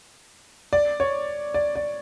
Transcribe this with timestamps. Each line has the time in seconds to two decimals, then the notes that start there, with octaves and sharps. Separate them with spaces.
0.73 D5
1.00 C#5
1.54 D5
1.75 D5